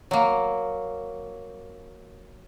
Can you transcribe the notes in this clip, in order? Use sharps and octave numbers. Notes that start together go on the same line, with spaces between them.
F#3 A#3